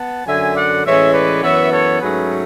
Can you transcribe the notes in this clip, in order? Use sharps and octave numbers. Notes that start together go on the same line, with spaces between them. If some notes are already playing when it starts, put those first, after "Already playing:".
Already playing: B3 F#5 A5
F#2 D3 F#3 E5 G#5
D5 F#5
A2 E3 G#3 C#4 C#5 E5
B4 D5
F#2 E3 B3 C#5 E5
A4 C#5
G#2 F#3 A3 C#4 G#4 B4